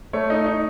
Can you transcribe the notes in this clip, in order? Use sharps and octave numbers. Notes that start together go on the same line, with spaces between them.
A3 C#5
D#4
D#4